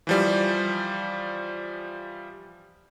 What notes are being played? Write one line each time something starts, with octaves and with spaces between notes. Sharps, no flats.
E3 F3 G3